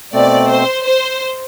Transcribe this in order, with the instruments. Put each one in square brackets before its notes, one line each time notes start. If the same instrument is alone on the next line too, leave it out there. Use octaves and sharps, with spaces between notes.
[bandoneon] B2 A3 C4 [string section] D5
[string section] C5
C5